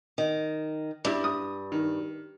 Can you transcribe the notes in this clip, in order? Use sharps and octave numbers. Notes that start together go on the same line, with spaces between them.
D#3
G2 D4 E4
D#6
D#3